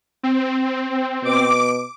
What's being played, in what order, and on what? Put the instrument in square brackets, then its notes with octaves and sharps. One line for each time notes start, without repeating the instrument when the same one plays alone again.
[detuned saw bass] C4
[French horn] B2 [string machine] D6